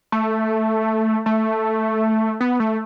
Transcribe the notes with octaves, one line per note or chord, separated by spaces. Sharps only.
A3
A3
B3
A3